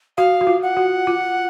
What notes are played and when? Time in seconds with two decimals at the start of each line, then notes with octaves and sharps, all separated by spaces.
0.17 F#4 F5
0.41 F#4
0.47 F4
0.62 F#5
0.77 F#4
1.07 F4